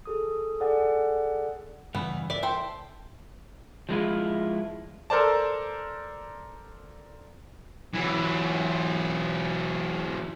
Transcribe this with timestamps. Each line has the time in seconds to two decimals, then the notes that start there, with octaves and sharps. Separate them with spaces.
0.05 G#4 A4 D#6
0.60 G#4 A4 D5 F#5 G#5
1.95 G2 C#3 E3 B3
2.30 A#4 D5 E5
2.43 A4 C5 G5
3.89 F3 G#3 E4 F4
5.10 A4 A#4 C5 D5 A5
7.94 E3 F#3